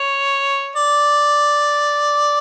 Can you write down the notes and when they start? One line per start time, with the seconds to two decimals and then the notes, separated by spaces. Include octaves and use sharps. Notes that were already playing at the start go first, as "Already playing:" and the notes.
Already playing: C#5
0.76 D5